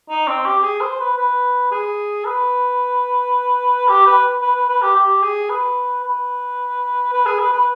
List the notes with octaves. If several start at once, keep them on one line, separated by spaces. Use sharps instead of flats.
D#4
C4
G4
G#4
C5
B4
B4
G#4
B4
G4
B4
B4
B4
B4
G4
G4
G#4
B4
B4
B4
G#4
B4
B4